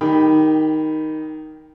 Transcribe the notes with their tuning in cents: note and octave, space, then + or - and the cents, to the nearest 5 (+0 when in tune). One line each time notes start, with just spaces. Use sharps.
D#3 +0 G4 +15 B5 +0